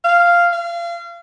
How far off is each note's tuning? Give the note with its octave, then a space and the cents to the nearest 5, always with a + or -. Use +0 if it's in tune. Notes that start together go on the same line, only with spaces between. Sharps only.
F5 -5
F5 -35